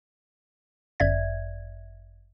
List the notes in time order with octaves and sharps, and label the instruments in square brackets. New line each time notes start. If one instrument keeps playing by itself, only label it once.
[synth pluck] G1 F#2 D5 E5 G#6